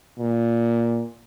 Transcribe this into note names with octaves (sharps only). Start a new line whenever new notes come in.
A#2